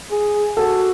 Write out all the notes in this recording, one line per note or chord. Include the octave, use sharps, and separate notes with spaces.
G#4
F#4 A4